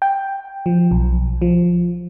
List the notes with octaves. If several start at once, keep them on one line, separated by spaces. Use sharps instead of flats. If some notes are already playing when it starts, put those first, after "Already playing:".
G5
F3
B1
F3